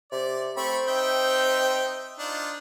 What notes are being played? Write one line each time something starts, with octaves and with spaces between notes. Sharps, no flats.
C3 D5
A3 C4 B5 C#6
D#4 E5 G5
D4 D#4 F4